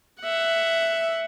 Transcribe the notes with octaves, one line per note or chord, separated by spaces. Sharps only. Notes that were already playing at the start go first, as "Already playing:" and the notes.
E5 F#5